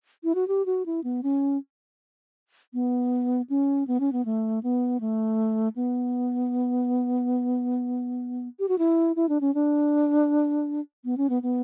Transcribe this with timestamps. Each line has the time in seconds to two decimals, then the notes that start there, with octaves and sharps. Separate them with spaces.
0.24 E4
0.35 F#4
0.48 G4
0.66 F#4
0.86 E4
1.04 B3
1.23 C#4
2.74 B3
3.50 C#4
3.88 B3
4.00 C#4
4.12 B3
4.25 A3
4.63 B3
5.01 A3
5.76 B3
8.59 G4
8.69 F#4
8.79 E4
9.16 E4
9.29 D4
9.41 C#4
9.55 D4
11.05 B3
11.17 C#4
11.30 B3
11.43 B3